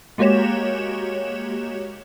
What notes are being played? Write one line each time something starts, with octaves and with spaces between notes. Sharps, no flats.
G#3 A#3 F#4 G4 C#5 E7